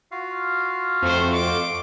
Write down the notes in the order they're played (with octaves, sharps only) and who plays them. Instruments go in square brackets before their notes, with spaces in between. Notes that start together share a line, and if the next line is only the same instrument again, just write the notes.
[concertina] F4 F#4 F5
[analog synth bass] F2 [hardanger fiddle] A3 C5
[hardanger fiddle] D6